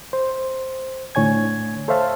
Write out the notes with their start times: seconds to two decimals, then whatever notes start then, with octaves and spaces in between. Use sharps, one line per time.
0.13 C5
1.15 A2 D3 C#5 G#5 G#6
1.88 A4 C5 C#5 E5 F5 A5